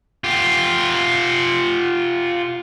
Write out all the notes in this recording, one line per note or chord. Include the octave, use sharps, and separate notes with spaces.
F4 G4